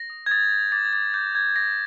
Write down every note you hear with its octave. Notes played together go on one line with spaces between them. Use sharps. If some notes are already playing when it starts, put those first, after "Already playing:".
Already playing: A#6
D#6
G#6
D#6 A6
G6
D6 A6
G#6
D6 A6
D6 G6
D6 G#6
D6 A#6